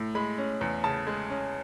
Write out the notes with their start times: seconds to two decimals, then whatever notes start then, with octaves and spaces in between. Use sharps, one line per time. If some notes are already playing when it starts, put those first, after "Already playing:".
Already playing: A2
0.15 G#3 B5
0.38 C#4
0.61 E2
0.84 C#3 A5
1.07 G#3
1.30 C#4